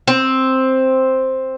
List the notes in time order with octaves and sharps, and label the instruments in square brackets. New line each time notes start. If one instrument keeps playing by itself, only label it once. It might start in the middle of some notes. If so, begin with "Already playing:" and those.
[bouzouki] C4